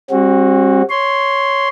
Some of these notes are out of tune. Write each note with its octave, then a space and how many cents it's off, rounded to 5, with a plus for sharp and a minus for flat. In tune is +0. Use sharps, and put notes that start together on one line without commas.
G3 +30 C4 +40 F#4 +0
C#5 +0 C6 +0